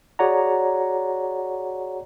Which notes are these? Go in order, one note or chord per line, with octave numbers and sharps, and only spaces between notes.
F#4 G#4 C#5 D5 F#5 A#5